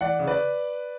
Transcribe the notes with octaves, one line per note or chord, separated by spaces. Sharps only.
E3 D5 F#5
C#3
B4 D5